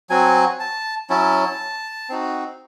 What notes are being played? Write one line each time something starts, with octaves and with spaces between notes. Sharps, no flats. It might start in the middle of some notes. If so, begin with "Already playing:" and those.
F#3 C4 F#4 G#5
A5
F#3 C#4 E4 A5
C4 D#4 F#4